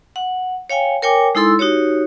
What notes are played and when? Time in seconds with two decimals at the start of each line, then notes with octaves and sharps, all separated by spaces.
0.16 F#5
0.70 C#5 F5 G5 G#5
1.02 A#4 C#5 G5 G#5 D6
1.35 G#3 D#4 E4 A4 C6 E6
1.59 D#4 F#4 G4 C#5